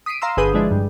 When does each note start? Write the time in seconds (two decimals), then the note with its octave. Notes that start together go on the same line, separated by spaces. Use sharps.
0.06 D#6 B6 C7 D7 D#7
0.22 F5 A#5 C6 E6
0.37 G1 D3 G#4 B4 D#6 G6
0.54 F3 G#3 D4 E4
0.71 G2